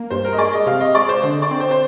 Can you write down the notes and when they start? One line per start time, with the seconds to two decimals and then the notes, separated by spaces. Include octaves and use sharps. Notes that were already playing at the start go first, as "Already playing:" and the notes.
Already playing: A#3
0.10 G2 C5
0.25 A#4
0.33 D#5
0.38 G#3 D5
0.53 D#5
0.66 C3 F5
0.80 D#5
0.95 G#3 D5
1.09 C5
1.24 D3
1.42 D5
1.51 C4
1.60 C5
1.71 C5